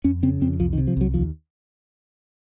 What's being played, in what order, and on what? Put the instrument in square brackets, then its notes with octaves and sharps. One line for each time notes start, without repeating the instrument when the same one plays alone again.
[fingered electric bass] F2 C#4
C#3 C4
F2 C4
C2 F3
D#3
C3
F3
C2 F#3
D#2 F3